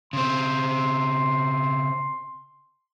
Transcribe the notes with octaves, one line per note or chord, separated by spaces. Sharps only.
C#3 C4 C6